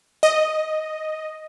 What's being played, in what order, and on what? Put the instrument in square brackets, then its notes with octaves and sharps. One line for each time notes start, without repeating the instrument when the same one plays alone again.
[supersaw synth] D#5